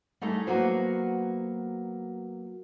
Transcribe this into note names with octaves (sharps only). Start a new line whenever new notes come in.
G3 A3 D#4 G#4 A4
F#3 A#3 B3 F#4 B4 C5